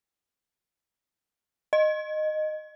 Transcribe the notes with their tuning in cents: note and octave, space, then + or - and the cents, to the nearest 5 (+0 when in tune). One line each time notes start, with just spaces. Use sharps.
D#5 -15